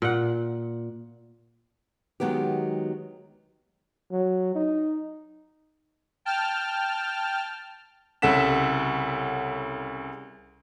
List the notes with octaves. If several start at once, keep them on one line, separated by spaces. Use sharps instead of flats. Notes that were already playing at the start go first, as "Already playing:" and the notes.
A#2 F#5
D#3 F#3 G#3 B3 G4
F#3
D#4
G5 A5 F6
C2 C#3 A4 F#5 B6 E7